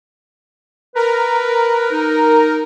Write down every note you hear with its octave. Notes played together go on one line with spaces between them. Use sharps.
A#4 B4
D#4